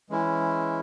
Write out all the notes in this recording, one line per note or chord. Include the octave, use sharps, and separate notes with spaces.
E3 G#3 C#4 E4